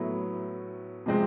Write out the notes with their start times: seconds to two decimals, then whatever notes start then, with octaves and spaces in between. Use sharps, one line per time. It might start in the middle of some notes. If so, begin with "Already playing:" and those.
Already playing: A2 F#3 B3 E4
1.06 C3 F3 G#3 C4